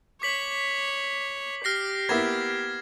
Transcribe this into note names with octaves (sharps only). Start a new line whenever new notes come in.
C#5 D6 B6 F#7
G4 F6 A#6 C7
A#3 B3 E4 G#6 A#6 E7